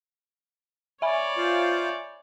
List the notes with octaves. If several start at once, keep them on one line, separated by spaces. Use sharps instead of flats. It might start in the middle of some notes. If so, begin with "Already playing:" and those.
C#5 D5 E5 G#5 B5
F4 C5